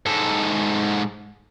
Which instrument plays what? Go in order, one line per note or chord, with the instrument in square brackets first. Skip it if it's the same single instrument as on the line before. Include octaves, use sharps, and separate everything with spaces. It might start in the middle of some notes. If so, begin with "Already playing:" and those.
[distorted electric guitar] G#2 A4